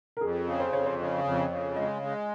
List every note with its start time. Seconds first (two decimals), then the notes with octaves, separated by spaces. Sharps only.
0.17 A#4
0.21 F2 G#4
0.47 C#3
0.60 C5
0.73 F2 C#5
0.86 C5
0.99 C#3
1.24 F2
1.50 C#3
1.76 G#3 D#5
2.02 G#3